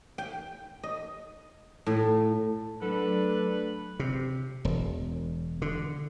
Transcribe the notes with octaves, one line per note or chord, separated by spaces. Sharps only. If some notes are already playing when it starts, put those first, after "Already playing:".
G5
D#5
A2
F#3 A3 D4 A4 B4
C3
E1
D3